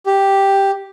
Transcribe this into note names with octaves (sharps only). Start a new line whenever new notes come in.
G4